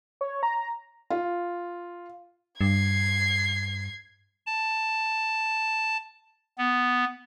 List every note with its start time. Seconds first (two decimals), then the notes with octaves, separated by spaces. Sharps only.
0.21 C#5
0.43 A#5
1.10 F4
2.61 G2 G#6 C7
4.46 A5
6.58 B3